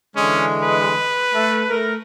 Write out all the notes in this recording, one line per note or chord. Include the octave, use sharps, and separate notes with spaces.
D3 E3 G#3 C#4
B4
A3
A3 A#4